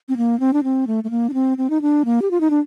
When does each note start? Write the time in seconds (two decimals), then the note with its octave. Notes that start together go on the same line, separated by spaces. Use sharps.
0.09 C4
0.17 A#3
0.40 C4
0.53 D4
0.64 C4
0.87 A3
1.04 A3
1.11 A#3
1.29 D4
1.34 C4
1.58 C4
1.70 D#4
1.82 D4
2.05 A#3
2.22 G4
2.31 F4
2.41 D#4
2.50 D4